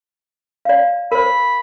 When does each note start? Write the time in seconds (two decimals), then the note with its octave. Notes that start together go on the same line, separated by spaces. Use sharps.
0.65 D5 F5
1.12 A#4 C5 B5